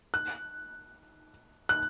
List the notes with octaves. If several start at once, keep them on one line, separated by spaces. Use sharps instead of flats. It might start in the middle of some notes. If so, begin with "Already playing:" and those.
F#6
F#6